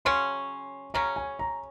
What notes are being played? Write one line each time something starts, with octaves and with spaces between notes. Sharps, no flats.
C#3 F#3 C#4 C6
C#3 F#3 C#4 A#5
G#5
A#5